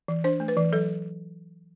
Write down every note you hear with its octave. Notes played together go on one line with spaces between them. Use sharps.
E3
D4 C5
A3
B4
E3
F#3 A4